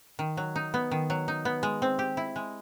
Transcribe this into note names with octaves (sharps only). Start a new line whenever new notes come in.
D#3
F#3
D#4
B3
D#3
F#3
D#4
B3
G#3
C4
G4
E4
G#3